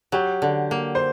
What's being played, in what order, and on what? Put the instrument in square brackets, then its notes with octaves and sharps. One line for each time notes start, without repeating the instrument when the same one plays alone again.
[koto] F#3 [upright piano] G4
[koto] D3
A#3
[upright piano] C5